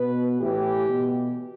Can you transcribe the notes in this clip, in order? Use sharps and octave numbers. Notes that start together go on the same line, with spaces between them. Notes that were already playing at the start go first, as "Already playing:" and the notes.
Already playing: B2 B4
A2 E3 G4
B2